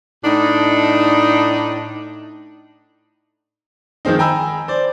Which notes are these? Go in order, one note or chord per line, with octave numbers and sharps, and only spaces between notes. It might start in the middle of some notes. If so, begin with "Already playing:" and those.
A2 D4 D#4
D#3 F3 G#3 C4 D#4
G5 G#5 A#5 B5 E6
C5 D5